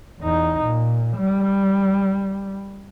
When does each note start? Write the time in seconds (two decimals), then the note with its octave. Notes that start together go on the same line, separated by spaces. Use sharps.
0.20 E2 D#4
0.63 A#2
1.17 G3